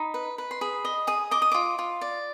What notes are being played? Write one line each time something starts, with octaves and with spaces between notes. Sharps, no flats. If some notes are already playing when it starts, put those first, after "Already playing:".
Already playing: D#4 B5
B4
B4
C6
G#4 B5
D#5
G#4 D#6
D#5 D6
D#6
F4 D6
F4
D5